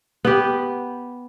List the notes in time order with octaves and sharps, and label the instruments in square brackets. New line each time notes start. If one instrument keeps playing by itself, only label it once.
[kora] B3 G4